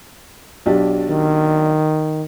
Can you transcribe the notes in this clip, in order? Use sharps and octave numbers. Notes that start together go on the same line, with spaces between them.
B1 D4 G4
D#3